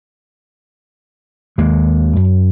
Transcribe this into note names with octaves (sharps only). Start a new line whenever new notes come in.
D#2 G#3 A#3
F#2